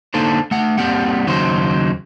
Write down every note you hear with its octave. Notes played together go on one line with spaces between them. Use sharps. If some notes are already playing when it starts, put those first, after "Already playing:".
D3 A#3 D#4 A4 C5
A3 F#5
G3 A#3 C4 G4 F#5
D#2 C#3 F#3 D#4 C5